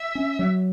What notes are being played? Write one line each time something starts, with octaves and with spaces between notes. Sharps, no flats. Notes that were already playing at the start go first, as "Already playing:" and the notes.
Already playing: E5
C#4
F#3